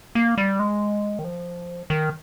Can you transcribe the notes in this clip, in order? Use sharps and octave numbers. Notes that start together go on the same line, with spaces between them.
A#3
G3
G#3
D#3
F3
D#3